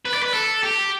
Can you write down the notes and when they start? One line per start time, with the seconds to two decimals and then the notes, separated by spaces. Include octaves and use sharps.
0.05 B4
0.14 D5
0.23 B4
0.34 A4
0.63 G4